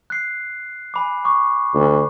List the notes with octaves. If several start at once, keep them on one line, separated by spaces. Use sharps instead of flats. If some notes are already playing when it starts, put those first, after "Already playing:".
F#6 C7
G#5 B5 D6
C#6 D6
D2